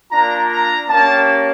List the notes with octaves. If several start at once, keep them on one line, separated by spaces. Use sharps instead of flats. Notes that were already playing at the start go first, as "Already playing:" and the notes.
A#3 D4 F4 A#5
A#5
A#3 C#4 G4 A5